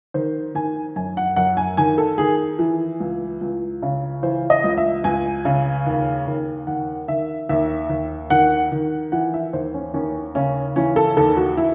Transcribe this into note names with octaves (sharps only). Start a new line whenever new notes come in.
D#3 C5
D#3 G#5
F#2 G#5
F#5
F#2 F#5
G#5
D#3 G#5
A4
D#3 G#4
E3
C#2
C#2
C#3
E3 C5
D#5
C#2
E5
C#2 G#5
C#3
D#2
D#2
D#3 F#5
D#3 E5
D#2 E5
D#2
D#3 F#5
D#3
E3 F#5
E5
D#2 C5
C#4
D#2 C#4
C#3 C#4
E3 C#4
A4
D#2 A4
F#4
E4